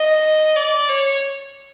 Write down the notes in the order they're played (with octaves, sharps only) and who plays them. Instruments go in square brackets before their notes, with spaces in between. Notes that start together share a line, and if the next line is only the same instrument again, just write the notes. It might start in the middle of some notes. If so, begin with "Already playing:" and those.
Already playing: [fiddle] D#5
D5
C#5